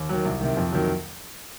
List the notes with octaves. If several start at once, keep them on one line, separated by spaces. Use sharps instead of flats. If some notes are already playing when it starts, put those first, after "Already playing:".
Already playing: D#2
D#3 F#3
C2
C3 D#3
F2
D#3 F#3